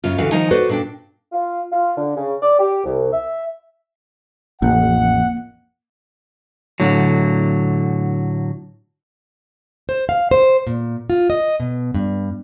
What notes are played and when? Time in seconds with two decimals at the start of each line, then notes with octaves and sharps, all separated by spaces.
0.04 F#2 C#3 F4
0.18 D2 D3 E3 F#4 F5
0.32 D#3 F3 D#4 G#5
0.51 F#4 A4 B4 C5 D5
0.69 A#2 D4 G5
1.32 F4
1.71 F4
1.96 D3
2.15 C#3
2.41 D5
2.58 G4
2.84 C2
3.11 E5
4.62 A1 F2 A#3 F#5
6.80 A2 D3 F#3
9.89 C5
10.09 F5
10.31 C5
10.67 A#2
11.10 F4
11.30 D#5
11.60 B2
11.94 G2